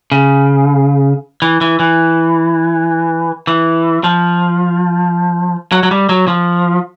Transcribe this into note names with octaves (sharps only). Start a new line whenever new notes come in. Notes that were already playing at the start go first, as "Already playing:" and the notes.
C#3
E3
E3
E3
E3
F3
F#3
F#3
G3
F#3
F3